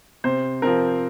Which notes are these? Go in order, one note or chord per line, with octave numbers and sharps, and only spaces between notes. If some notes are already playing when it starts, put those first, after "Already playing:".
C3 C5
F3 C4 A#4